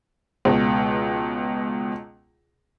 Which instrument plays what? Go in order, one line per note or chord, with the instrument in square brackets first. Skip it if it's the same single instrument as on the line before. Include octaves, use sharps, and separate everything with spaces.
[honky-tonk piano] C#2 B2